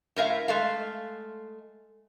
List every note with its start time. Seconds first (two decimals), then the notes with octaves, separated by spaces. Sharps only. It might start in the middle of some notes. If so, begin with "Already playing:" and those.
0.16 A2 A#4 E5 F5
0.48 G#3 A3 F5